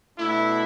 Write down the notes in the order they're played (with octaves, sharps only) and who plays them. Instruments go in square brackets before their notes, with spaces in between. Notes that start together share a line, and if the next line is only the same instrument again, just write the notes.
[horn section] B2 A3 D4 E4